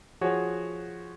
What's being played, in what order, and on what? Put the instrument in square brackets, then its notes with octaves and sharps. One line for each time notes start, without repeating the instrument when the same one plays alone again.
[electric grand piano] F3 F#4 G#4 C#5